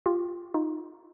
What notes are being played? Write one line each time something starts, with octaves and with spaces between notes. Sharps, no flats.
F4 G4
D#4 F4